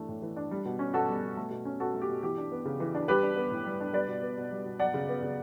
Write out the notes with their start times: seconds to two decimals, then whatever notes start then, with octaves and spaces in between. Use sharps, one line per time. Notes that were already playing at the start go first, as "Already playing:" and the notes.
Already playing: E3 A3 D4
0.09 A2
0.22 E3
0.36 D4
0.51 G3
0.65 B2
0.79 C#4
0.94 B2 F#4 A4
1.09 G3
1.23 B2
1.37 A3
1.51 B2
1.65 C#4
1.80 B2 F#4 A4
1.94 A3
2.02 G4
2.09 B2
2.23 E3 G4
2.38 D4
2.52 B3
2.66 C#3
2.80 E3
2.95 D4
3.08 G3 G4 B4
3.23 D4
3.36 B3
3.52 A2
3.66 G3
3.80 D4
3.93 G3 B4 D5
4.08 B2
4.23 B3
4.38 B2
4.51 G3
4.65 B2
4.80 F#3 D5 F#5
4.94 C#3
5.09 B3
5.23 C#3